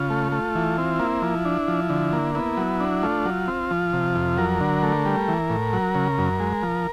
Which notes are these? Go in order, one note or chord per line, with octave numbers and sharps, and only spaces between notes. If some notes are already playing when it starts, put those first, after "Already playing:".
Already playing: C#3 F4
A3
A3
E3
C4
A#3 E4
F3
D4
F3
D3
A#3
B3 E4
F#3
D4
A3 F4
F#3
C4
F3
C3
F2
F#3 A#4
D3
A3
G3
E3
A2
F#3
C#3
F#2
G#3
F3